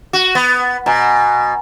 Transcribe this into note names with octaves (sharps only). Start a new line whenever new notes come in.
F#4
B3
B2 G#5 A#5